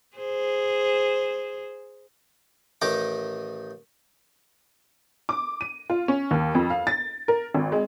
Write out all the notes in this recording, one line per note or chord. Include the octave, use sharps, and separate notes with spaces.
G#4 C5
A1 D#3 D#4 D6
D6
D#7
F4
C#4
D#2
F2
F5
A6
A#4
G#1
G#3